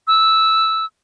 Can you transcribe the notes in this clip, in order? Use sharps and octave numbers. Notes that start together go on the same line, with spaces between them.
E6